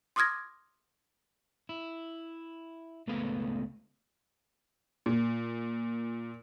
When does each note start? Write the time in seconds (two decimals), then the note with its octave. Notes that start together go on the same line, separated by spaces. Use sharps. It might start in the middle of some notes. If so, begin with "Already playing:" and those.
0.16 C6 D6 D#6 F6 G#6 A#6
1.69 E4
3.07 C#2 A3 B3 B4 F5
5.06 A#2